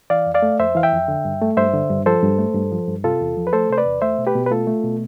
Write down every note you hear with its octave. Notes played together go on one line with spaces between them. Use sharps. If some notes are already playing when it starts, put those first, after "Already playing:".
E3 D5 F5
F2
D5 F5
A3
F2 C5 E5
E3 F5
E5 G5
F2
D3
G2
A3
G2 C5 E5
D3
G2
F3 A4 C5
G2
A3
G2
F3
G2
C3 F4 A4
E2
F3
B4
A3 A4 C5
C3 C5
B4 D5
E2
A3 C5 E5
B2
G4 B4
B2
B4
A3 F4 A4
A3
B2